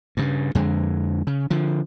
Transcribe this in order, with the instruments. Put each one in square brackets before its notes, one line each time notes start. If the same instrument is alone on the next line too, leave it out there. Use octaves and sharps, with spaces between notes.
[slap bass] G2 C#3
F2 D3 G#3
C#3
D3 F3